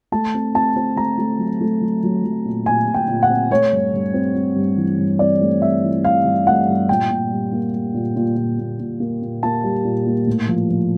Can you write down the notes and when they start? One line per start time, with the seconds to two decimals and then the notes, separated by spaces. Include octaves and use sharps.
0.12 A3 A5
0.34 C4
0.55 C4 A5
0.76 C4
0.97 A3 A#5
1.18 A3
1.39 F#3
1.61 A3
1.81 F#3
2.03 F#3
2.24 F#3
2.45 A#2
2.66 A#2 G#5
2.88 A#2
2.94 G5
3.08 A#2
3.23 F#5
3.30 C4
3.51 A3 C#5
3.72 G2
3.93 G2
4.14 C4
4.35 C4
4.56 G2
4.77 E3
4.99 G2
5.19 C4 D5
5.40 A3
5.62 C4 E5
5.83 E3
6.04 E3 F5
6.25 G2
6.46 A3 F#5
6.68 G2
6.89 A#2 G5
7.10 A#2
7.31 G3
7.53 A#3
7.74 G3
7.94 A#2
8.16 A#2
8.37 A#2
8.59 A#2
8.80 A#2
9.00 A#3
9.22 A#2
9.43 A#3 A5
9.63 G3
9.85 A#2
10.06 A#3
10.27 A2
10.48 F3
10.69 F3